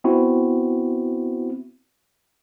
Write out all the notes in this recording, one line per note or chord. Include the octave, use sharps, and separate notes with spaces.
B3 C4 E4 F#4